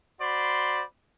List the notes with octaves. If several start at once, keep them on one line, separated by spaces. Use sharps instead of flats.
F#4 C5 D5 B5 C6